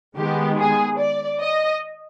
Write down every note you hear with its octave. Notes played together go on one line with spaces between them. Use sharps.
D#3 G#3 B3 G4
G#4
D5
D#5